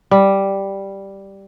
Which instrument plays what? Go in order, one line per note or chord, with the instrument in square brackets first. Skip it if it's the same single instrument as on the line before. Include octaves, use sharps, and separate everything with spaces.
[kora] G3